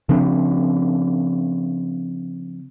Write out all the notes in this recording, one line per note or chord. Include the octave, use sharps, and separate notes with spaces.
C#3 F3 C4 D4